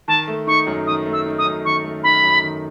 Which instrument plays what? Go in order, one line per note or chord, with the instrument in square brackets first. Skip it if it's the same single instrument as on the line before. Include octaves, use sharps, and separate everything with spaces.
[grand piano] D#3 [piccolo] A5
[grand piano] A3
[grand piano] D#4 [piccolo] C#6
[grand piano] F#2
[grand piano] D#3 [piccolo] D#6
[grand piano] A3
[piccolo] E6
[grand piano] D#4
[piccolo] D#6
[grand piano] F#2
[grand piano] D#3 [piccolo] C#6
[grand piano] A3
[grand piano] D#4 [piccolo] B5
[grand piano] F#2
D#3